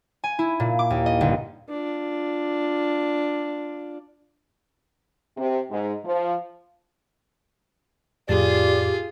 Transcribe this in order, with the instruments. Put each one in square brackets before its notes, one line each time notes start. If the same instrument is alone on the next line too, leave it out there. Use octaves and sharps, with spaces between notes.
[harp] G#5
E4
A#2
D6
D#2
D#5
G1
[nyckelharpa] D4 F4
[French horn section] C3
G#2
F3
[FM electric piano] F2 A2 A6 [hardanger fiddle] F4 G#4 [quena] G4 [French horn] D5